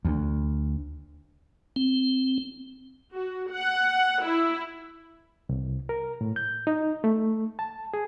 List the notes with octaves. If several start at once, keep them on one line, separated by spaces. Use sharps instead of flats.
D2
C4
F#4
F#5
E4
C2
A#4
A2
G6
D#4
A3
A5
G#4